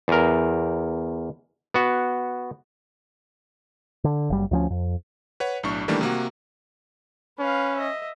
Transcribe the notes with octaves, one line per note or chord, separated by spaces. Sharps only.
E2 A#4
B3 F#4
D3
F#1 G3
D2 F3 C#4
F2
B4 C#5 F#5
B1 A2 D4 C#6
D#3 E3 G3 A3 A#3 D4
C3 A#3 F#4
C#4 B4 F5
D#5 E5